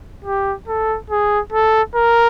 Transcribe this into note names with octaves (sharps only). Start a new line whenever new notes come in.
G4
A4
G#4
A4
A#4